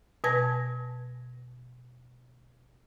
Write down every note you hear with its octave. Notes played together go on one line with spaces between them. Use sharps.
B2 B4 G#5 A5 G#6 A#6